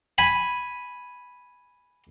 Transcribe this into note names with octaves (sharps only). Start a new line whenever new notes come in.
G#5 B5